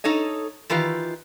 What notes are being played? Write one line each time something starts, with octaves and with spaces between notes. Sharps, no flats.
D#4 A4 C#5 D#5
D#3 E3 F4 G4 B4